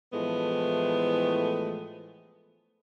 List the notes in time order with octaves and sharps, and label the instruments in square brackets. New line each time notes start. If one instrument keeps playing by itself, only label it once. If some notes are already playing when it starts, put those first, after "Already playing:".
[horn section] A2 E3 F3 G#3 A3 B3